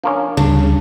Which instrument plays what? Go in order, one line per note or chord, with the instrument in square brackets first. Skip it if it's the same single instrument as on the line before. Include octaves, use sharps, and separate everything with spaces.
[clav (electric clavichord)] F3 A#3 C#4 [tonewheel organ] D4
[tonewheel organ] D2 G3 [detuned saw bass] C#3 [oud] D4